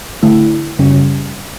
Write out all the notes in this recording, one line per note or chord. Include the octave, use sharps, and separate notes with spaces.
D3 A3 E4
F#2 C#3 G3 C#4